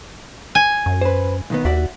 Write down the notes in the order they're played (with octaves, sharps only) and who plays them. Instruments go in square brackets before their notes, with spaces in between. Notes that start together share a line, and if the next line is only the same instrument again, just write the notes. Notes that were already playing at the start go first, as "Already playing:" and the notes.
[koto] G#5
[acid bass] F#2
[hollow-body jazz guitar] B4 C5
B1 D#3 B3
[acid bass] D#2 [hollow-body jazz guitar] F#4 D5 E5